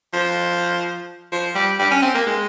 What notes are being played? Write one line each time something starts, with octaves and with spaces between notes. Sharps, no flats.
F3
F3
G3
G3
C#4
C4
A#3
G#3